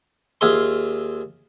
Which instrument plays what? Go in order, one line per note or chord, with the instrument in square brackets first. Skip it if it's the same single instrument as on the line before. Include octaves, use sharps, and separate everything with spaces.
[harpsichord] D#2 F4 G#4 E5 C6